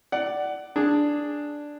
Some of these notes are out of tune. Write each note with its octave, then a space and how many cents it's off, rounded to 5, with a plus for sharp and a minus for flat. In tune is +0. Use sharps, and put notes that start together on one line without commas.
D5 +0 F#5 +20
D4 +0 G#4 +0